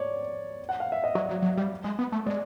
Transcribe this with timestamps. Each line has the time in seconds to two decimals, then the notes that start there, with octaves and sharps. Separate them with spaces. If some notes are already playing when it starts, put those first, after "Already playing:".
Already playing: C#5 D5
0.69 F#5
0.80 F5
0.92 E5
1.04 D#5
1.15 F#3 D5
1.29 F#3
1.42 F#3
1.57 G3
1.84 G#3
1.99 B3
2.12 A3
2.26 G#3 D5